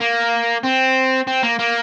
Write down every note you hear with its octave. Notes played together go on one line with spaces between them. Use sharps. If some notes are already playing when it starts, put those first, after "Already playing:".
A#3
C4
C4
A#3
A#3